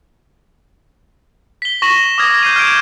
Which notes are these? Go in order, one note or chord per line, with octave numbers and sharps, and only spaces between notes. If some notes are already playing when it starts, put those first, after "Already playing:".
B6 G7
C#6 A#6 E7 F#7
D6 D#6 F6 G#6 A#6
G6 C7 D#7
F6 G6 G#6 D7 E7